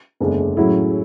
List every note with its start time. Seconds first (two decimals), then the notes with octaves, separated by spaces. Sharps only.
0.20 F#1 E2 D3 G#3
0.57 A2 F#3 C#4 E4 G#4